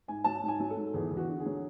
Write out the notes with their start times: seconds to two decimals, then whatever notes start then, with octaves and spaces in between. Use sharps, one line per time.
0.08 G#2 G#5
0.24 F#3 A5
0.43 G#2
0.48 G#5
0.60 F#3
0.70 A4
0.76 G#2
0.94 E2 G#4
1.11 E2
1.17 F#4
1.29 D3
1.40 G#4
1.45 F#3